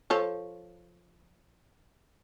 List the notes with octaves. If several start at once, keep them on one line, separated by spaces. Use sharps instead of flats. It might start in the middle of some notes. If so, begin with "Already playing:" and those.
F3 A4 C#5